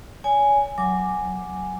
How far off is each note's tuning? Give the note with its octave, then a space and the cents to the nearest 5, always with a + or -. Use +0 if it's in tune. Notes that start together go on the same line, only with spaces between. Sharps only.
C#5 +40 G#5 +0
F#3 +0 G#5 +0 D6 +0